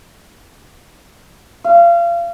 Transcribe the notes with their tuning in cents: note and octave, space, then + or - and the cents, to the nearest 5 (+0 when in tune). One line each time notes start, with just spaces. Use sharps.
F5 -30